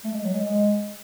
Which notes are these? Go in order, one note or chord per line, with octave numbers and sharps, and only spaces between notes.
A3
G#3
F#3
G#3
G#3